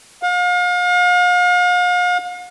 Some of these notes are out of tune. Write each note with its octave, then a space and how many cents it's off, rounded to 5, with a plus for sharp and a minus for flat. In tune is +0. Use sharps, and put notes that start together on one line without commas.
F5 +40